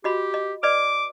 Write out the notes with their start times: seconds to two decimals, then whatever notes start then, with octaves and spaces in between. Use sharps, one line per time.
0.04 F#4 G4 D#5 B5
0.34 D#5
0.63 B4 D5 D#5 D6